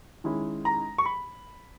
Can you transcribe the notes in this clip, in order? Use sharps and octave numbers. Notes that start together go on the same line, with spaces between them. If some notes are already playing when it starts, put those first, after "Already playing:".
D#3 G#3 C#4 E4
A#5
C#6
B5